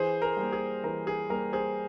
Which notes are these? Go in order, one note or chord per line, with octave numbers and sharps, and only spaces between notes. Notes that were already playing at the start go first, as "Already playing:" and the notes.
Already playing: E3 G#4 C5
A#4
G3 A#3
G#4
E3 A#4
G#4
G3 A#3 A#4
G#4 C5